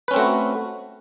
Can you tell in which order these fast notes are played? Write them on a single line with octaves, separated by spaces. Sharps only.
B4 C#4 C4 A3 F#4